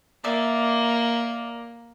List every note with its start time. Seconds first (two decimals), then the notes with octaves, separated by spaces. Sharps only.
0.24 A#3 D5 E5